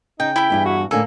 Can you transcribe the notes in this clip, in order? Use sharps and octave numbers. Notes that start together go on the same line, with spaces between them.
C#3 D#4 G5
E4 G5 B5
E2 G2 G#4
F#4
A2 D3 A#3 A4 G#5